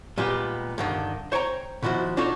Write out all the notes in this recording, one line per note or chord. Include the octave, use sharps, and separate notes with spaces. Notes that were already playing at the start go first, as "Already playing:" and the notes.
A#2 G3 G#3 B3 G4
G2 D3 D#3
C5 C#5 G5 G#5 A#5
B2 D#3 F3 E4 F#4
D4 D#4 F4 F#4 A4 C#5